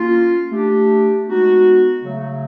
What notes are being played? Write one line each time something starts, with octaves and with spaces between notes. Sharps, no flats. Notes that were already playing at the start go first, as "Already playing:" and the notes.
Already playing: A#3 C#4 F4
A3 D4 G4
G#3 B3 D#4 F#4
C#3 F#3 A3